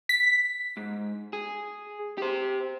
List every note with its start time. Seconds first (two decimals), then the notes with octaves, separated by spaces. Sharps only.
0.09 B6
0.77 G#2
1.33 G#4
2.18 G4 C5